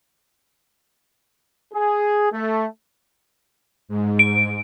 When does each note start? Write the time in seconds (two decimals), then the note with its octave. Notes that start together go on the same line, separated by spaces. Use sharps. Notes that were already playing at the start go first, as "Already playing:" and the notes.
1.74 G#4
2.32 A3
3.89 G#2
4.19 D7